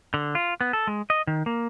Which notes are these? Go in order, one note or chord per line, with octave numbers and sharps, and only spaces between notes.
D3
F4
B3
A4
G#3
D#5
D#3
A#3